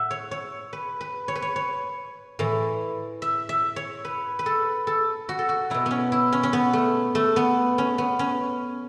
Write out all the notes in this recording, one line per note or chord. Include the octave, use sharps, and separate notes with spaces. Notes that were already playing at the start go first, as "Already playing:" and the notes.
Already playing: A2 E5 F#5
C#5
C#5
B4
B4
C#5
B4
C#5
C#5
A2 E3
E5
E5
C#5
B4
B4
A4
A4
F#4
A4
F#4
B2 F#3 E4
B3 C#4
E4
C#4
C#4
B3
A3
A3
B3
C#4
B3
C#4